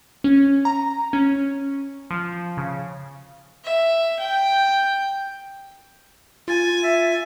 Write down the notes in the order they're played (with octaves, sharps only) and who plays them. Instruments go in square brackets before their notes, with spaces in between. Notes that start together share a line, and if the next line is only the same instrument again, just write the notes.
[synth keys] C#4
A#5
C#4
F3
C#3
[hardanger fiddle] E5
G5
[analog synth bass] F4 [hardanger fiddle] G#5 [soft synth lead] A6
[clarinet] E5